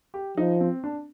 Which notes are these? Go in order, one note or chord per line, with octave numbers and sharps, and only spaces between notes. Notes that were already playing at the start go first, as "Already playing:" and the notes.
G4
F3 D#4
C4
D4